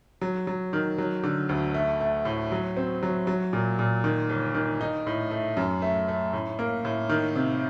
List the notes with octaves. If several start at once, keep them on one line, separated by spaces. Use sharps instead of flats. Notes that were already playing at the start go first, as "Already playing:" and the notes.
F#3
F#3
D#3
F#3
D3
D2
A3
A3
A2
F#3
C4
F#3
F#3
A#2
A#2
D#3
G1
D#3
D#4
A2
A3
F#2
A3
A3
A2
A#3
A2
D#3
C3